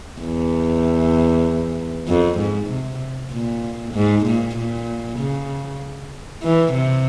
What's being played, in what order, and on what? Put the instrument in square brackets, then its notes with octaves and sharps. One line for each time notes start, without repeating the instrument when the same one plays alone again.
[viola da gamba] E2
F2
G#2
C3
A#2
G#2
A#2
A#2
C#3
E3
C3